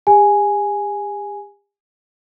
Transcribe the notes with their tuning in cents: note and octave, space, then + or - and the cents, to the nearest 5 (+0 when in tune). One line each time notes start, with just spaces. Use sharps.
G4 +45 G#5 +0